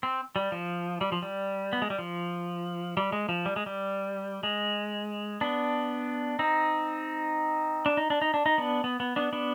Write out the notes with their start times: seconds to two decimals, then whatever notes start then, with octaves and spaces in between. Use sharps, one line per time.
0.03 C4
0.36 G3
0.52 F3
1.01 G3
1.12 F3
1.22 G3
1.73 B3
1.82 G#3
1.90 G3
1.99 F3
2.97 G3
3.12 G#3
3.29 F3
3.46 G3
3.56 G#3
3.66 G3
4.43 G#3
5.41 B3 D4
6.39 C4 D#4
7.86 D4
7.97 D#4
8.10 D4
8.22 D#4
8.34 D4
8.46 D#4
8.58 B3 D4
8.84 B3
9.00 B3
9.16 B3 D4
9.33 B3 D4